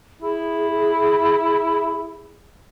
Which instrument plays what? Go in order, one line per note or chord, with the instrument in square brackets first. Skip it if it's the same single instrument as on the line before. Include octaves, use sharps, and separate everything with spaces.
[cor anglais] E4 [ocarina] G#4